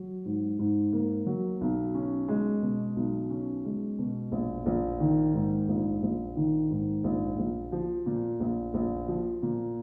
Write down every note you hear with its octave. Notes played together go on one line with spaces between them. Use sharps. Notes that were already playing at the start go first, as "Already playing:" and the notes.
Already playing: F#3
G#2
G#2
A#3
F#3
B1
C#4
G#3
B2
B1
C#4
G#3
B2
A#1
A#1
D#3
G#2
A#1
A#1
D#3
G#2
A#1
A#1
F3
A#2
A#1
A#1
F3
A#2